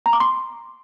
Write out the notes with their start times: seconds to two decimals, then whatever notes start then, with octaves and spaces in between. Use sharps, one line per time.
0.06 A#5
0.13 D6
0.20 C6